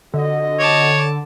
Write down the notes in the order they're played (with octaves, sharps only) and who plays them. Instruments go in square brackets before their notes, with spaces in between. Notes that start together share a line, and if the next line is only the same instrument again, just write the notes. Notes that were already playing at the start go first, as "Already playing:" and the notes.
[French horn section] F2 F#4 D#5 [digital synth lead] D3
[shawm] C#5 [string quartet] A5 D6